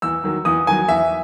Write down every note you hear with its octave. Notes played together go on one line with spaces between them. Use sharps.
E2 E6
D#3 F#3
E2 D#6
D#3 F#3 G#5
E2 E5